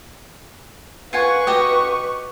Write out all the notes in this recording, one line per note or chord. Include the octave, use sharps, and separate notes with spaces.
F4 B4 F#5 G#5 C#6
F#4 G4 D#5